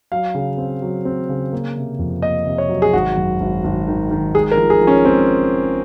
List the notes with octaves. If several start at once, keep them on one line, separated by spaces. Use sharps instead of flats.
F#3 F5
C#3
C4
F#3
C4
C#3
A#3
C3
F2
A#3 D#5
C3
C#5
F#3
G#4
G#1 F#4
F#2
G#1
G#1
D#3
D#3
G#3 G#4
A#4
F3
G#4
F3
C#4
G#3 C4